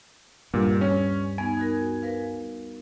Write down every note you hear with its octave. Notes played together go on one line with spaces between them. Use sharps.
D2 G2 A#2
G3 C#4
B3 D#4 G#5
D#4 F#4 A#4
A#4 B4 F5